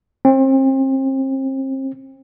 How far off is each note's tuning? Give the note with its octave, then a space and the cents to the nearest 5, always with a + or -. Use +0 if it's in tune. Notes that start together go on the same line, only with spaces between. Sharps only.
C4 +35